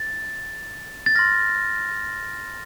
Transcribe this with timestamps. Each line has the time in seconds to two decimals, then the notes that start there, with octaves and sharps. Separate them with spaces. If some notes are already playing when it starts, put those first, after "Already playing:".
Already playing: A6
1.06 A6
1.15 C6 F6 A#6